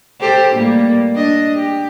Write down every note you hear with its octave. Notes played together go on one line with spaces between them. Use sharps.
G4 A4 C5
A2 G3 A#3
D4 D#5
G4